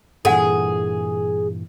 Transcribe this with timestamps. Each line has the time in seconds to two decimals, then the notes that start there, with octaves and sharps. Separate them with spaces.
0.25 G2 A#2 E3 G#4 A4 F#5 G#5